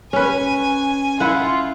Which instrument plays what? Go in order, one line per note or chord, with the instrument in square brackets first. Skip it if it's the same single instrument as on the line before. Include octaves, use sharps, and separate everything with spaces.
[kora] C#4 B4 [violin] G#5
[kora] E4 F#5 [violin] F4